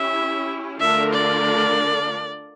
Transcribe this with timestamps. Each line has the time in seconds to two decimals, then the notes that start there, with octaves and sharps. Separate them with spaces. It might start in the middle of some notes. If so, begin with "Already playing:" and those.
Already playing: C#4 E4 G4 E5
0.80 D3 A3 D4 F4 A#4 E5
1.13 D5